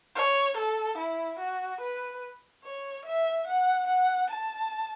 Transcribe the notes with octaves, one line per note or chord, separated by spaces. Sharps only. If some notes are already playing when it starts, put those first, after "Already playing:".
C#5
A4
E4
F#4
B4
C#5
E5
F#5
F#5
A5